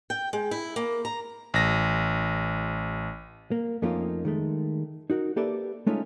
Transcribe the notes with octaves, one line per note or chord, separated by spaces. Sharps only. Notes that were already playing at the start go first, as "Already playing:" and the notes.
G5
G#3
E4
A#3
A#5
A1 A#6
A#3
F2 A3 A#3 C#4 D#4 F4
D#3 G#3 A3
D#4 F#4 A#4
A#3 G4 A4 B4 D5 E5
G#3 A3 C#4 D#4 F4 E5